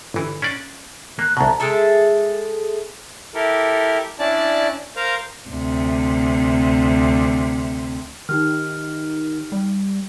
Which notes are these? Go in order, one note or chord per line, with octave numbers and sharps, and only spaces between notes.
G1 E3
C#4 D4 D5
A#3 F#6
C2 B2 A5 A#5
G#3 G#4 A4 E5
E4 G4 A4 A#4
C#4 D4 E4 D5 A5
A#4 C5 F5 A#5
D2 C3
D#3 D#4 G4 F6
G3